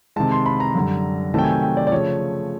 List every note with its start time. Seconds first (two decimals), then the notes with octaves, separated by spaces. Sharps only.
0.16 C3 D#3 G#3 A5
0.32 C6
0.46 B5
0.60 A#5
0.75 F#2 D3 G3
1.34 C3 D#3 F#3 A3 G5 A5
1.44 G#5
1.52 G5
1.62 G5
1.77 D5
1.87 D5
1.92 C#3 F3 A3 C#5